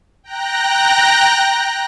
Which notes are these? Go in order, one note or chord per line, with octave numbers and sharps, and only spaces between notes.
G5 A#5 F#6 A#6